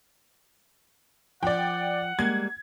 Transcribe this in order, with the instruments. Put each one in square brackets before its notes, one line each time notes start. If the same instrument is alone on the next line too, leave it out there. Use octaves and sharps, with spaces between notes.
[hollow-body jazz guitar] F3 [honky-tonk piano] D5 G5 [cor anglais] F#5
[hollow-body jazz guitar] G3 G#3 A#3 [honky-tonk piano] G#6